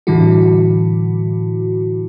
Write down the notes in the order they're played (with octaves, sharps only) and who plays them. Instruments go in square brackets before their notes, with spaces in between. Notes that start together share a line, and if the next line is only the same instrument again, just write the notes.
[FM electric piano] A2 D3 E3 G3 E4 F#4